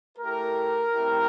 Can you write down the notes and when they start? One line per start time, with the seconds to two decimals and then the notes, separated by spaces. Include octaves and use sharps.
0.18 A3 E4 G4 A#4
0.92 A3 C4 E4 G4